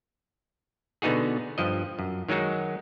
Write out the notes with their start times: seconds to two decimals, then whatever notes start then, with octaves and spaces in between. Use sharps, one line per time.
1.02 B2 D3 B3 D#4 F#4 G#4
1.58 G2 F3 D#5
1.99 F#2
2.29 D#3 F#3 G#3 D#4 F#4